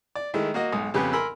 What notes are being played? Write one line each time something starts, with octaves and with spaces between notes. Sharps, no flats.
D5
D#3 G#3 A3 E4
A#3 F#4 D#5
B1 G#2 D#6
F2 C#3 B3 G4 B4
A#4 G#5 B5 C6 E6